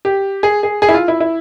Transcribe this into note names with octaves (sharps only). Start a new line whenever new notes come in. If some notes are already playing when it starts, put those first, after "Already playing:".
G4
G#4
G#4
G#4
E4
F4
E4
E4